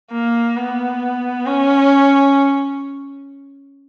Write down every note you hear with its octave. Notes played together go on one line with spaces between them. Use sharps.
A#3
B3
C#4